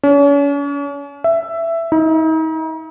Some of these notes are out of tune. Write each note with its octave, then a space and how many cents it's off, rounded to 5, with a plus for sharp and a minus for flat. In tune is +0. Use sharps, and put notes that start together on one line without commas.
C#4 +40
E5 +10
D#4 +40